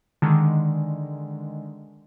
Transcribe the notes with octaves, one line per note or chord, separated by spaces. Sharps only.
D3 D#3 G#3